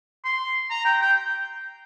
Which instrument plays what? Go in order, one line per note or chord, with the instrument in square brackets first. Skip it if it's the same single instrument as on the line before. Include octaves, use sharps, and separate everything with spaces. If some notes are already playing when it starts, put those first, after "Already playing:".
[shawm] C6
A#5
G5
G5